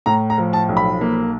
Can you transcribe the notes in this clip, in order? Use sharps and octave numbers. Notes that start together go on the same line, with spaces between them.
A2 A#5
A#5
F3
A5
B1
B5
A#3